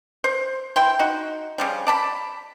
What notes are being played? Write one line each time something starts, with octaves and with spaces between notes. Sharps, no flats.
C5
E4 G5 C6
D#4 F#4
C#3 F3 G3
D5 A5 B5